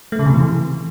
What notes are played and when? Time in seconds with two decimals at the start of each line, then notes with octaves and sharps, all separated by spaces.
0.12 A3
0.19 C#3
0.26 C3
0.33 E3